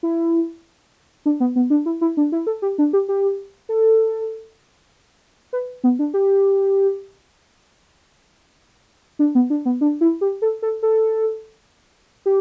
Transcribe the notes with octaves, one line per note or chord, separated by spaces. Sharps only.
E4
D4
B3
B3
D4
E4
E4
D4
E4
A4
G4
D4
G4
G4
A4
B4
B3
D4
G4
D4
B3
D4
B3
D4
E4
G4
A4
A4
A4
G4